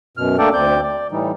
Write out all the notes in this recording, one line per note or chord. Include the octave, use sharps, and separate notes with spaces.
F#2 B2 F6
A3 A#3 D4 A4 D5 G5
D2 C4 D5 G6
D5
A2 E3 G3 D#4